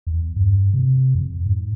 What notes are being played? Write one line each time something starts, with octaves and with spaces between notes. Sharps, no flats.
E2
G2
C3
F2
G#2